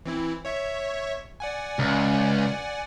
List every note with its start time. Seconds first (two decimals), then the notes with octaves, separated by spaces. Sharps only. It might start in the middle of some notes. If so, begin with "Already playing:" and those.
0.06 E3 C4 E4
0.45 C#5 E5 C#6
1.40 D5 F#5 G#5
1.79 C#2